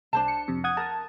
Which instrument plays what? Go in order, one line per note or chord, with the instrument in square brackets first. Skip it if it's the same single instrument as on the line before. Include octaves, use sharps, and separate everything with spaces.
[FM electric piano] C2 [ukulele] D4 C5 A5
[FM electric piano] C#7
F2 C3
F#5 D#6 G#6
[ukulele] A#4 [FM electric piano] A5